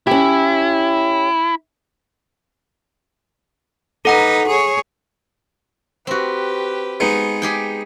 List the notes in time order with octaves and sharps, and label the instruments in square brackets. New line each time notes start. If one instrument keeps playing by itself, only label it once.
[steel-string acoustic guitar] C#4 G4 [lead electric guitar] E4
[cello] D#4 B4 [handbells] A4 F#5 A#5
[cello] G#4 C#5
[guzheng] C4 F#4 [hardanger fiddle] G4 B4
[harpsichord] G#3 B3 D#4
[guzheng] G4 G#4 G5